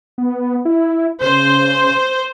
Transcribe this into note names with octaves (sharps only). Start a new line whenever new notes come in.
B3
E4
C#3 C5